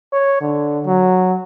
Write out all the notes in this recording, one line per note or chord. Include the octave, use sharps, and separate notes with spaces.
C#5
D3
F#3